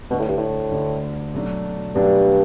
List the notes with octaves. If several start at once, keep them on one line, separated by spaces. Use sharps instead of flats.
D2 B2 D3 A3 D4
A2
G2
A2
D2 D3 A3 D4
B2 F#3 A3 D4
G2 B2 F#3 A3 D4